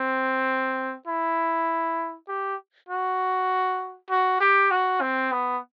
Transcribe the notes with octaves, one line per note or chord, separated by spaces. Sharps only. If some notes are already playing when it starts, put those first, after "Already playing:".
Already playing: C4
E4
G4
F#4
F#4
G4
F#4
C4
B3